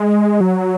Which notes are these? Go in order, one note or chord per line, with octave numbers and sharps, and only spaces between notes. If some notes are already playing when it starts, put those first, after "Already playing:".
Already playing: G#3
F#3